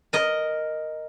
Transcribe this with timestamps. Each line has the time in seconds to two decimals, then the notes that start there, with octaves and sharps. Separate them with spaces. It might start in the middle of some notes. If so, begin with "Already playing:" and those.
0.13 A#4 D#5